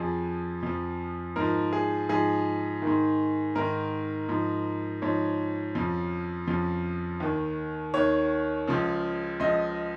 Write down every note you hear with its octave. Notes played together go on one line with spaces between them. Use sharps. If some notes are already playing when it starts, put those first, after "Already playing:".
Already playing: F2 F3 G#4
F2 F3
G#2 F3 A#4
G#4
G#2 F3 G#4
D#3
G#2
G#2 D#3 A#4
G#2 F3
G#2 F3 C#5
F2 C#3 F3
F2 C#3 F3
D#2 D#3
D#2 D#3 C#5
C#2 C#3 F3
C#2 C#3 F3 D#5